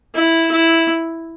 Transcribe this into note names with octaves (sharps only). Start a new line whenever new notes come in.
E4
E4